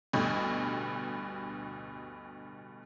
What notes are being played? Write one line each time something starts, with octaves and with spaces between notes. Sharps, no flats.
A1 D2 G2 B2